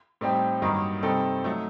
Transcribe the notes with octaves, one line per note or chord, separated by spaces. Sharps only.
A2 G3 C4 D#4 G4
G2 D#3 F#3 A#3 D#4
C3 G3 C4 D#4 A4
F#3 A3 D#4